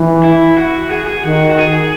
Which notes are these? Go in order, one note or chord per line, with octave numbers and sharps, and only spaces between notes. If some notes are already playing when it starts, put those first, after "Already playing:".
Already playing: E3
E4
F#4
G#4
G#4
D#3 F#4
F#4
G#4